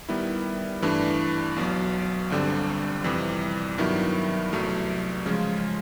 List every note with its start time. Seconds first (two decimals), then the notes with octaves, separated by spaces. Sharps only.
0.09 D#3 G3 B3 E4
0.82 G2 E3 A3 D4
1.56 B1 B2 F#3
2.30 G1 G2 D3 G3 C4
3.04 F2 C3 E3 G3
3.78 G2 D#3 F#3 B3 E4
4.52 C2 B2 F#3 A3
5.26 C#3 F3 G#3 C#4 F4